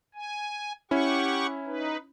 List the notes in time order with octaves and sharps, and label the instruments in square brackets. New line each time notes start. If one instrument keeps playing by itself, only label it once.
[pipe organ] G#5
[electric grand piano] C#4 E4 [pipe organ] G4 F#5 C#6
[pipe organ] D#4 B4